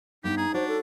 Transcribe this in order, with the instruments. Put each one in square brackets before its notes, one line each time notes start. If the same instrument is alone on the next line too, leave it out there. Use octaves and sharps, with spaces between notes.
[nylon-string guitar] G2 B3 [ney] D#4 [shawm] G4
[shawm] G#4 [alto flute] A#5
[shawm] D4 [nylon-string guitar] F#4 C#5 [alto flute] C5
[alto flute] A4